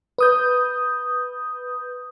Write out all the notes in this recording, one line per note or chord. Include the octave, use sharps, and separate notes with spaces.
B4 D#6 G6